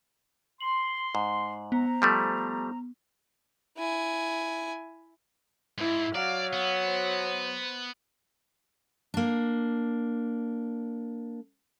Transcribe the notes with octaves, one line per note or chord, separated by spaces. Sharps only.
C6 F#7
G#2
B3 C5 A#5
F3 G3 A3
E4 G#5
G#2 E4
F#3 D5 F5
B3
C5
A#3 D4